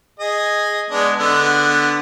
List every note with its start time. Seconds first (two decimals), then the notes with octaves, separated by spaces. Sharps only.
0.20 G#4 D#5
0.91 G#3 B3 D4
1.19 D3 B3